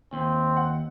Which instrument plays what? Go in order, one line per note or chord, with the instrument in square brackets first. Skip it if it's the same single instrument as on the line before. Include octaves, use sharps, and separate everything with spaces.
[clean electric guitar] D#2 [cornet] C4
[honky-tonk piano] F#5